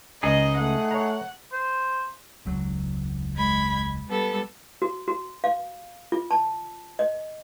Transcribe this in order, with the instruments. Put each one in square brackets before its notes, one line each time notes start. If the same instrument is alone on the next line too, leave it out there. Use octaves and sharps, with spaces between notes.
[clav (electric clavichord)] C#2 G#5 [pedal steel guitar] D#4 G#4 [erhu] D#5
[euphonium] A3 [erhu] F#5
[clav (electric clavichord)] C#5 A#5
[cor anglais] C5
[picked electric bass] E1 C#2 F#3
[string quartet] G#3 B5 G#6
G3 B3 A4
[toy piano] F#4
F#4
F5
F4
A5
D#5